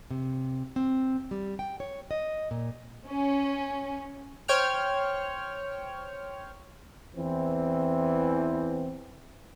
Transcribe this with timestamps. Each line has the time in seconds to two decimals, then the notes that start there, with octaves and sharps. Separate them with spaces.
0.11 C3
0.76 C4
1.31 G3
1.59 G5
1.80 C#5
2.11 D#5
2.51 A#2
3.08 C#4
4.48 C5 C#5 G5 F6
7.16 E2 E3 C4